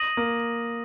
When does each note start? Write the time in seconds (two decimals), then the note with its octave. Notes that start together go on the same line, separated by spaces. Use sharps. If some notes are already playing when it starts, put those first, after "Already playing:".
Already playing: D#6 A#6 D#7 F#7
0.17 A#3